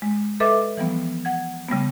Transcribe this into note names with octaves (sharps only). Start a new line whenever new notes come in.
G#3
A4 B4 D#5 E5 D6
E3 F3 G3 B3
F#5 G#6
C#3 G3 A3 B3